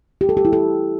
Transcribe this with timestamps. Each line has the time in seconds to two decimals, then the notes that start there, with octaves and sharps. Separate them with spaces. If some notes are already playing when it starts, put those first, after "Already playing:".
0.21 G4
0.29 A4
0.37 G4
0.45 E4
0.53 A4